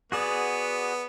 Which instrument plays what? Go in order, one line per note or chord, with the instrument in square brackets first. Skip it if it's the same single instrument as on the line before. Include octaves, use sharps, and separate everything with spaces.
[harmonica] B3 [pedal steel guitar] F#4 G#4 D5